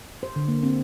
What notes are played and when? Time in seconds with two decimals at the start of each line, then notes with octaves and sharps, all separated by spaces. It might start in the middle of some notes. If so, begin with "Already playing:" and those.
0.23 C5
0.36 D3
0.48 A#3
0.63 C4